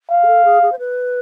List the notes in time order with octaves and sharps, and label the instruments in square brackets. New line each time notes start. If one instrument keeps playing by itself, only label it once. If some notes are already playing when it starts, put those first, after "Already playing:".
[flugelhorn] F5
[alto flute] G#4
A4
G#4
G#4
C5
B4